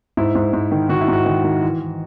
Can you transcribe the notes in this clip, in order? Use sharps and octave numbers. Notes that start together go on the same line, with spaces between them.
G#2 E4
G#2
G#2
D#3
D#3 F#4
E4
G#2 F#4
D#3
D#3
E3
E3